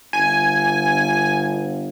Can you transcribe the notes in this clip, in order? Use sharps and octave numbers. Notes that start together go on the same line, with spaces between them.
G1 G#5